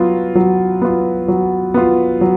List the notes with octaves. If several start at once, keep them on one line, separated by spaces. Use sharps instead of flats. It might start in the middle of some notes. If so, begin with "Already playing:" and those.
Already playing: F#3 B3 F4
F#3
B3 F4
F#3
B3 F4
F#3